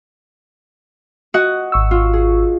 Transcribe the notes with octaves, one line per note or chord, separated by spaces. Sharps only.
F#4 D#5 F#5
G#1 C#6 E6
F4
G#4